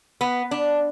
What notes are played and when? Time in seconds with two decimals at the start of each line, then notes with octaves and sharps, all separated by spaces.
0.21 B3
0.51 D4